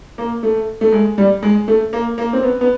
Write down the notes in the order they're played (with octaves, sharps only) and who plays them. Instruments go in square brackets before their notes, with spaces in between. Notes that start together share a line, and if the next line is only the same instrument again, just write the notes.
[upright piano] A#3
A3
A3
G#3
G3
G#3
A3
A#3
A#3
C4
B3
B3